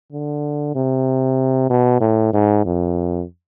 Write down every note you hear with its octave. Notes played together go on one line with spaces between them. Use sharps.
D3
C3
B2
A2
G#2
F2